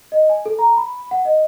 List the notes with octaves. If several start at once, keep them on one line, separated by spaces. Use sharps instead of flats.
D#5
G#5
A4
A#5
B5
F#5
D#5